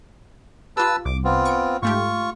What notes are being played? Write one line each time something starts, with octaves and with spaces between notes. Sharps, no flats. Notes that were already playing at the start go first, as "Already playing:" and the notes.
F4 G4 B4 A5 E6
C2 D6
B3 C4 F4
C#6 D7
G#2 A3 F4 G4 C#6